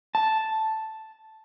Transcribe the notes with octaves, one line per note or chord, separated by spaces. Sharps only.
A5